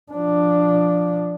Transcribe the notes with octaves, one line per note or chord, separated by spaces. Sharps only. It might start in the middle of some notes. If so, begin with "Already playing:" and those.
F3 D4